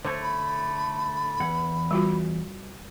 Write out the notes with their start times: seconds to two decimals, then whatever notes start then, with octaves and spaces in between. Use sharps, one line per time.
0.05 D3 A3 C5 C#5
0.22 B5
1.40 E2 E3 F#5
1.91 G3 F4 F#4